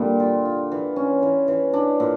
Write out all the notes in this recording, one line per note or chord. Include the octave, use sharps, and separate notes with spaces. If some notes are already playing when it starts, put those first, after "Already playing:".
Already playing: A#2 D3 G3 D4
F4
F4
E3
C#4
E3
E3
D4
A#2